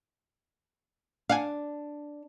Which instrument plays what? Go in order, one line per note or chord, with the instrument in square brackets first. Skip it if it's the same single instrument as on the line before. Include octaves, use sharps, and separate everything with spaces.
[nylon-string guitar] D4 [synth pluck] F5 F#5 G#5